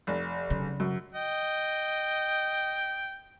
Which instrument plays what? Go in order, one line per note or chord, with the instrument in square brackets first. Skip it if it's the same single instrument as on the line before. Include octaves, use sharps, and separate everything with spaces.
[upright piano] F1
[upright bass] C#3 F#3
[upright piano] F#2
[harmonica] D#5 G5